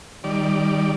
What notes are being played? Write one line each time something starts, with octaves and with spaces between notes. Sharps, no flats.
D#3 G3 D5